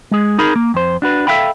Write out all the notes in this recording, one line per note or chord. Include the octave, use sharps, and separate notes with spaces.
G#3 G#4
D#4 G#4 A#4 B5
A#3
F2 C5
D4 F#4 B4
A4 B4 E5 F5 G5 B5